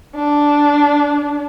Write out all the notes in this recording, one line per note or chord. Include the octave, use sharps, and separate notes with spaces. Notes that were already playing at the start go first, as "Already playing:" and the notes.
D4